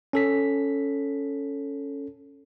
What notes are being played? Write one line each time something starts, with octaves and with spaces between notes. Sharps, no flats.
C#4 A4 B6